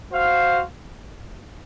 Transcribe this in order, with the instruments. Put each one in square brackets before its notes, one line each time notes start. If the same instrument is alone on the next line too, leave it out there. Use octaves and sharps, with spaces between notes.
[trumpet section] F#4 C5 F5